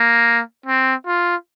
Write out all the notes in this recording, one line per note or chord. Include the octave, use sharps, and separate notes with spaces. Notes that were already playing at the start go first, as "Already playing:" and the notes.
Already playing: A#3
C4
F4